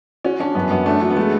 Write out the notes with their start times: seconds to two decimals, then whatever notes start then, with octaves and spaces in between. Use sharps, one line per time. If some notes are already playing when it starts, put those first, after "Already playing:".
0.25 C#4 F#4
0.40 C#4 D4
0.55 F#2 B3
0.71 F#2 B3
0.86 A3 D4
1.02 F#3 D4
1.10 B3
1.17 G#3 A3